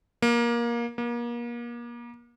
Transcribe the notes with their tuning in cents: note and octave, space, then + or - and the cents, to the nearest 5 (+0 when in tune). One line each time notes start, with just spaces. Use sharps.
A#3 +20
A#3 +35